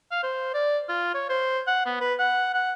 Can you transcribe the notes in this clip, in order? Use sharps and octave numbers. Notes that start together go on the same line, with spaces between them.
F5
C5
D5
F4
C#5
C5
F#5
B3
B4
F#5
F#5